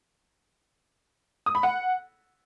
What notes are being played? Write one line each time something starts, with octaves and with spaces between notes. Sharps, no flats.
D#6
B5
F#5